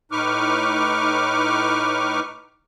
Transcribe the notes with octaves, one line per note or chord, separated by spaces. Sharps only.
A2 D#4 B4 C#6 D6 F6